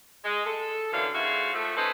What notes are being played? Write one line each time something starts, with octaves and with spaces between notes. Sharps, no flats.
G#3
A4
F#2 A2 D3 E3 F5
G#2 E4 F#4 F5
F3 A3
C#4 D#4 A4 B4 C5